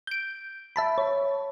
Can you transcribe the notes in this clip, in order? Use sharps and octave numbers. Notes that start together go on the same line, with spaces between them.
G6 D7
E5 A5 B5
C#5